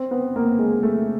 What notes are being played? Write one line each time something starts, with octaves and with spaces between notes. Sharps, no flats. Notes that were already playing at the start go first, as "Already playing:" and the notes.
Already playing: C4
B3
A#3
G#3
A3